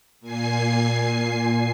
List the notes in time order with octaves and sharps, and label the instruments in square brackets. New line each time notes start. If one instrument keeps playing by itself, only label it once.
[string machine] A#2 G#5 C7